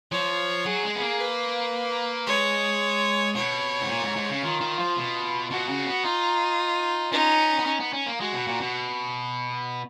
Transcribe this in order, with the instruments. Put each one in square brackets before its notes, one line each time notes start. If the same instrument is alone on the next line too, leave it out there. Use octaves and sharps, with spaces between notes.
[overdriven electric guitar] F3 [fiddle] C#5
[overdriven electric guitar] F#3 [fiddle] G#4
[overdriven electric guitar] G#3
B3
A#3
[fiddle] B4
[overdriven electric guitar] G#3 [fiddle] C#5
[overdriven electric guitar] B2 [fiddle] C#5
[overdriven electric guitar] G#2
A#2
G#2
G#2
C#3
[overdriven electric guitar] D#3 [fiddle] F4
[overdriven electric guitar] D#3
F3
B2
[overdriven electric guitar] B2 [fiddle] F#4
[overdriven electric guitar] C#3
B3
[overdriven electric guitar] D#4 [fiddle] F4
[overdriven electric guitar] C#4 [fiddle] D#4
[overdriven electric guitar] B3
C#4
B3
C#4
A#3
[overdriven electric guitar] G#3 [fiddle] F#4
[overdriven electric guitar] B2
A#2
B2